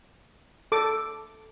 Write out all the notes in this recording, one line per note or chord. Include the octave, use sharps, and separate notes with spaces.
A4 D6